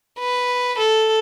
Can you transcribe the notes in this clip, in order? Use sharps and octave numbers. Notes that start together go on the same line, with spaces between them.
B4
A4